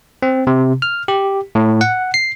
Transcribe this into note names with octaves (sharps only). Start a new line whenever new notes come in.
C4
C3
F6
G4
A2
F#5
C7